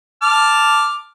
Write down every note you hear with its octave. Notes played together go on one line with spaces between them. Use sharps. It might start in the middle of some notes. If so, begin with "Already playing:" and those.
A5 D6 F6